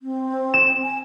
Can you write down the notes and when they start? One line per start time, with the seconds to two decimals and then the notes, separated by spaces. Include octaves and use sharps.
0.01 C4
0.54 E7
0.83 G#5